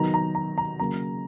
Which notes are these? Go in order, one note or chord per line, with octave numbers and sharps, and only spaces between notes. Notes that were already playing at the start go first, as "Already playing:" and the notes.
Already playing: D#3 F#3 B3 D#4 A#5
A#5
A#5
A#5
C#3 F#3 A#3 A#5